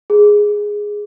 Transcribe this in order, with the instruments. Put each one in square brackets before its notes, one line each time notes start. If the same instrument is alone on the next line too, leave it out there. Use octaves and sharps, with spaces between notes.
[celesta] G#4